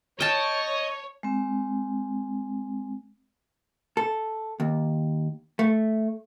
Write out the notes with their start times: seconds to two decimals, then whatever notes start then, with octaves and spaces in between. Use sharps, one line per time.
0.20 C#5 D#5 G5 A5
1.23 G#3 C4
3.97 A4
4.60 D#2
5.59 A3